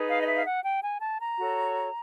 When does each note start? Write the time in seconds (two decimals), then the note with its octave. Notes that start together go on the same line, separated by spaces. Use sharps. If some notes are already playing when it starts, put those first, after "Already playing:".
Already playing: D#4 G#4 B4
0.09 F5
0.22 D#5
0.27 E5
0.36 F5
0.46 F#5
0.64 G5
0.82 G#5
1.01 A5
1.19 A#5
1.38 F#4 A4 C#5